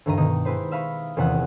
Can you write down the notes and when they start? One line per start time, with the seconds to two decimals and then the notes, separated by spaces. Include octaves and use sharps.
0.06 D2 G2 D#3 A#5 D#7
0.17 B2 D#3 D#4 A#5 D#6
0.45 G#3 E4 B4 C5
0.72 E5 F5 B5 C#6 D#6 B6
1.16 D#1 E2 C3 G#3 F#5